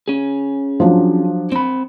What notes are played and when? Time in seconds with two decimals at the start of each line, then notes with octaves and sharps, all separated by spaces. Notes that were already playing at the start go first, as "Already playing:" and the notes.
0.08 C#4 G#4
0.80 F3 F#3 D4
1.52 C4 B5